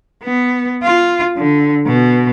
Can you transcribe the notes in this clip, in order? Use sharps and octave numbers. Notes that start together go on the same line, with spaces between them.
B3
F4
D3
B2